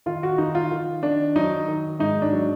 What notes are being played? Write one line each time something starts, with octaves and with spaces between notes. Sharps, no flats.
D#3 F4
F#4
D#3 D#4
F4
D#3
D#3 D4
F#3 D#4
D#3
G#2 D#4
D4
F#3